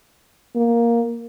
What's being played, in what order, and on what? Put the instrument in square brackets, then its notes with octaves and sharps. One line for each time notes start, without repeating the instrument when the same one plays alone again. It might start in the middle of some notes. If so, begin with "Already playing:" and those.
[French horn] A#3